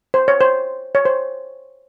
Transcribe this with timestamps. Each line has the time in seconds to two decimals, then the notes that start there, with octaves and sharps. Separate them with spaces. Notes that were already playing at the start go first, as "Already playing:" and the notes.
0.14 C5
0.28 C#5
0.41 C5
0.95 C#5
1.05 C5